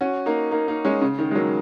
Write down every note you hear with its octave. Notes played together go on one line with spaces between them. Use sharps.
C#4 F#4
A#3 D#4
A#3 D#4
A#3 D#4
G#3 C#4
C#3
D#3
G#3
F#3 A#3